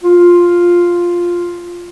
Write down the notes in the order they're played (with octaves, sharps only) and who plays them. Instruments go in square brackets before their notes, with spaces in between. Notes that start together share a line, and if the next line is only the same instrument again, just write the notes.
[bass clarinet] F4